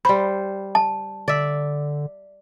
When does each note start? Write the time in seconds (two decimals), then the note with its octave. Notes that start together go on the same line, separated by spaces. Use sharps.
0.05 G3 C5 B5
0.75 A5
1.28 D3 D5 E5